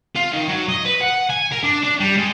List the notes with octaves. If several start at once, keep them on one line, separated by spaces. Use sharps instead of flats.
F4
D#3
F#3
D#5
B4
F#5
G#5
A#4
D4
D4
G3
G#3